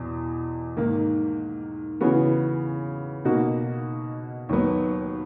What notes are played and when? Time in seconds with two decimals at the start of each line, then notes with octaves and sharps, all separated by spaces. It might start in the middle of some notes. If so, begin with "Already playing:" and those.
Already playing: E2 B2
0.77 G#2 D#3 A#3
2.01 C#3 E3 B3 F#4
3.25 B2 A#3 D#4 F#4
4.49 D#2 D#3 F#3 B3